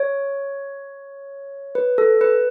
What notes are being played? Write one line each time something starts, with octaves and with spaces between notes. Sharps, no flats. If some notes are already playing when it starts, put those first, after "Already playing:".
Already playing: C#5
B4
A4
B4